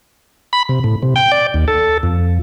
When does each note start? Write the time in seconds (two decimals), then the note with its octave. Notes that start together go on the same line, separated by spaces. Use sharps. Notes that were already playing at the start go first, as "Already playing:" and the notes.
0.53 B5
0.69 C3
0.84 A2
1.03 C3
1.16 G5
1.32 D5
1.54 D#2
1.68 A4
2.03 F2